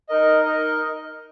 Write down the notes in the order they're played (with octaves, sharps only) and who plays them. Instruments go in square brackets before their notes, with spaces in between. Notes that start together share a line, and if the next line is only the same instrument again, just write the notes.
[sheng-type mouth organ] D#4 A#4 D#5
D#4 A#4 D#5